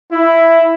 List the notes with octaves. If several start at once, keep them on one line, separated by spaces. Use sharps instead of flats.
E4